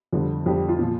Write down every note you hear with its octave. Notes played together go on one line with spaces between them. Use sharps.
F2 D3 G3
F2 D3 G3 G4
G4
F4
A#2 F3